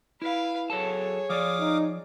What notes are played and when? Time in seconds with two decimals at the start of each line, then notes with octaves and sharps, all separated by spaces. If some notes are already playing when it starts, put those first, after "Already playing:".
0.22 E4 B4 F5
0.70 F#3 G#4 A4 C#5 A5
1.30 F3 D5 F5 D6 D#6
1.60 D#4